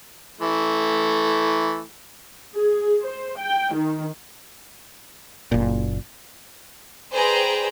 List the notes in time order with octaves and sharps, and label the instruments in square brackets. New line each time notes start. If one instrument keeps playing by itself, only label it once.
[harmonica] E3 A3
[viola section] G#4
C5
G5
D#3
[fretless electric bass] F#1 A#2
[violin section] G#4 B4 C5 D5 G5 A#5